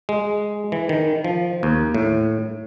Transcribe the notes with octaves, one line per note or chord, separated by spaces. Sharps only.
G#3
E3
D#3
F3
D#2
A2